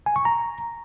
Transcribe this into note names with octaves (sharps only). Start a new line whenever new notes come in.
G#5
C#6
A#5